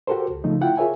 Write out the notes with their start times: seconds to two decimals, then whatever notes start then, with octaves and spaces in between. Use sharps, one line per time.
0.07 F#4 G4 A4 A#4 C5
0.30 C#2
0.44 C#3 F3 A3 D#4
0.61 E4 F4 F#5 G5
0.77 F4 G#4 A#4 C#5 E5 G#5